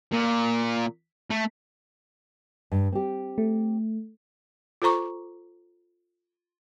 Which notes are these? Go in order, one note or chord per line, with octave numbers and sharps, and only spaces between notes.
A#2
A3
G2
C4 G4
A3
F4 A4 C5 A#5 C#6 D6